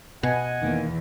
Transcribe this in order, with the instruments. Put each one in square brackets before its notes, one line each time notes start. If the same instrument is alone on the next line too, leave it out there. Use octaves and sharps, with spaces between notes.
[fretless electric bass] B2 [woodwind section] D#5 F#5 G#5
[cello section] E2 [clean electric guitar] D#3 A#3